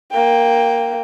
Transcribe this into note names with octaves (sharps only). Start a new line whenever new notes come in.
A#3 G5